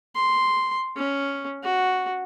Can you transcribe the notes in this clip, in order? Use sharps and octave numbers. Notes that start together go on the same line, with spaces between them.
C6
C#4
F#4